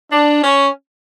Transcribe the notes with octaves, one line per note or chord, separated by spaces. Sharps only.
D4
C#4